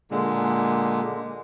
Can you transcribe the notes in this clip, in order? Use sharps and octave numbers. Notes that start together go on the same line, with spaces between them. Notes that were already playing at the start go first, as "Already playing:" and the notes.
A#2 D3 G#3